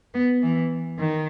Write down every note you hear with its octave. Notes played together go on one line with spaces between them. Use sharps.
B3
E3
D#3